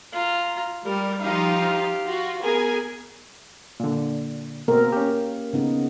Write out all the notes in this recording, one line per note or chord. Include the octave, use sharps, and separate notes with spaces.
F4 A#5
G3 A#4
F3 D#4 F4 G4 F5
F4 F#4
B3 G#4 A#4 G#5
A#2 D3
B2 A#3 C4 A#4
C#4 G4
C#3 B3 D#4